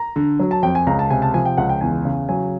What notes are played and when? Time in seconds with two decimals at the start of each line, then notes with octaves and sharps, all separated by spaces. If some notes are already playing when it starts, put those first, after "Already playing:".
Already playing: A#5
0.16 D3
0.40 F#3
0.51 A5
0.63 F2 G5
0.75 G#5
0.87 C#2 A#5
0.99 A5
1.10 C3 G#5
1.22 A5
1.34 F3 G#5
1.45 G5
1.57 C#2 F#5
1.69 G5
1.81 E2 G#5
2.05 C#3
2.29 F#3 G#5